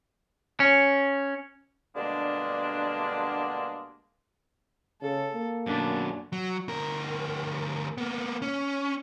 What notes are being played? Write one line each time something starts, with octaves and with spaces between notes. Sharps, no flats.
C#4
B2 D3 G3 G#3 A#3 D4
C#3 A4
A#3
F#2 B2 D4
F#3
D2 A#4
A#3 B3
C#4